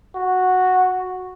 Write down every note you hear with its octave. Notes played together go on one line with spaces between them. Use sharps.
F#4